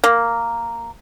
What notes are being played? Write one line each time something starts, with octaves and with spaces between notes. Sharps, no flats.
A#3